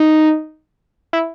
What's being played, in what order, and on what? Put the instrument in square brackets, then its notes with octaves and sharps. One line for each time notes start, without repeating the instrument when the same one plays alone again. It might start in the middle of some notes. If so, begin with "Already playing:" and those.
Already playing: [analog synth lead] D#4
E4